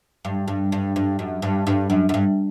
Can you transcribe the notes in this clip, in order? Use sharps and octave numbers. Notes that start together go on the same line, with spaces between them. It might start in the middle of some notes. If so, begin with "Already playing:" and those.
G2
G2
G2
G2
F#2
G2
G2
F#2
F#2
G2